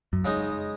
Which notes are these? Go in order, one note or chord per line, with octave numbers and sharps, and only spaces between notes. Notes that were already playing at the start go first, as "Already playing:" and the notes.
F#2
C#3 G#3 D#4